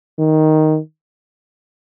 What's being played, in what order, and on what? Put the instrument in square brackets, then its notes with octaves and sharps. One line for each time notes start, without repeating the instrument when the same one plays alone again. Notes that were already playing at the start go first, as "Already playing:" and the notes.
[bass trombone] D#3